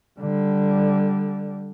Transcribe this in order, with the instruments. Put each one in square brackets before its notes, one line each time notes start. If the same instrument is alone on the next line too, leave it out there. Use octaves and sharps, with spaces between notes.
[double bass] D3 G3